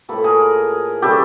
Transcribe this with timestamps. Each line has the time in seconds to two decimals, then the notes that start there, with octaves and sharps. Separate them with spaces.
0.09 A2 F3 A#3 A4 B4
0.24 G#4 A#4
1.02 C#3 E3 G3 G4 A4